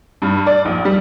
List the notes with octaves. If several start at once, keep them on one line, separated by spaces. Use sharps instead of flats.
G2
D5
A#1
G3